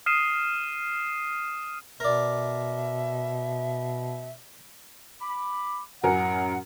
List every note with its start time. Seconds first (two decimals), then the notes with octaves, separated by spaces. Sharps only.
0.06 D#6 F6 C7 D#7 E7
2.00 B2 A#4 D5 E5
5.21 B5 D6
6.03 F#2 A2 F#3 A#4 F#5 G#5